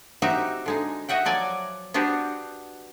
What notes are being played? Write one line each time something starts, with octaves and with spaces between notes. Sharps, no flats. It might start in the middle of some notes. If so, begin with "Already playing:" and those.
C4 D#4 F#4 G4 E5
D3 G#3 D#4
F#4 D#5 E5 F#5 G5
F3 F#3 D5 G#5
B3 D4 F#4 G4 C5